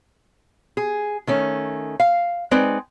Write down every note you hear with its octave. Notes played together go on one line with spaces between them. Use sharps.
G#4
D#3 A3 C#4
F5
G#3 C4 D#4 B4 D5